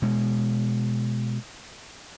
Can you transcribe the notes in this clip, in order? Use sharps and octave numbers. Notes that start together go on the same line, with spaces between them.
B2 G#3